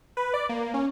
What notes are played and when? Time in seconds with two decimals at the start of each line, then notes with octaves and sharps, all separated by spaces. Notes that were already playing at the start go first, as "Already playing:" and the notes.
0.17 B4
0.34 D5
0.49 A#3
0.74 C#4